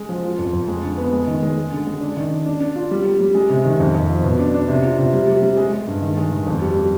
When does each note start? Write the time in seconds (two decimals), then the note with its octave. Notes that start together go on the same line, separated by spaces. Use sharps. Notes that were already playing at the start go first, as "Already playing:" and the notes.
Already playing: G#3
0.09 F3
0.23 F4
0.38 F2
0.53 F2
0.68 G#3
0.83 D3
0.97 B3
1.13 G#3
1.27 D#3
1.42 G#3
1.57 G#3
1.72 D3
1.87 G#3
2.01 D4
2.17 D#3
2.31 D4
2.46 D4
2.61 D4
2.76 F4
2.91 G3
3.05 G3
3.20 G3
3.35 G#3
3.50 C3
3.65 D#3
3.80 F2
3.95 F2
4.09 F3
4.24 B2
4.39 D4
4.54 D4
4.68 C3
4.84 F4
4.98 C3
5.13 G3
5.28 G3
5.42 G3
5.57 G#3
5.73 G#3
5.87 G2
6.02 D#3
6.17 G#3
6.32 D#3
6.47 F2
6.62 G3
6.77 G3